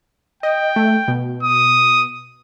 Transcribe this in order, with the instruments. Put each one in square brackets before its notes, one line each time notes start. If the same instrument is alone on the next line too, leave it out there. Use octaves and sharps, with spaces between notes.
[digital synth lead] D#5 [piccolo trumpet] G5
[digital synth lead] A3
B2
[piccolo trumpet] D#6